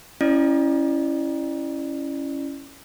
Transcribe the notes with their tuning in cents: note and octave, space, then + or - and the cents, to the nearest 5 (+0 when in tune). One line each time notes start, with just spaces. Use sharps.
C#4 +0 E4 +0 D5 +40